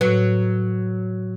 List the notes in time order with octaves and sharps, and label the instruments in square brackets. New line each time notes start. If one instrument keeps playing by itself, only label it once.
[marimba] A2 B4 [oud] F#3